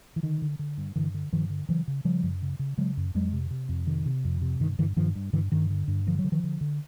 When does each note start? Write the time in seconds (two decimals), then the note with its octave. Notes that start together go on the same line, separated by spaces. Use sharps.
0.16 E3
0.23 D3 D#3
0.42 D3
0.59 D3
0.78 G2
0.96 G2 D3 E3
1.14 D3
1.33 G2 D#3 F3
1.50 D3
1.69 C#3 E3 F#3
1.88 C#3
2.05 C#3 F3 G3
2.23 F#2
2.42 C#3
2.59 C#3
2.78 C#3 F#3 G#3
2.97 F#2
3.15 F2 F#3 G#3
3.33 C3
3.51 C3
3.69 F2
3.87 C3 D#3
4.06 C3
4.24 F2
4.42 C3
4.60 G2 D#3
4.79 G2 D3 E3
4.96 G2 D#3 F3
5.15 G2
5.33 G2 D3 E3
5.52 G2 D#3
5.70 D3
5.88 G2
6.07 D3 F3
6.19 F#3
6.24 D3
6.32 D#3 F3
6.43 D3
6.61 D3